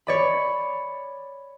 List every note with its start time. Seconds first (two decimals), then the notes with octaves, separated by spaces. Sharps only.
0.07 C#5 D5 B5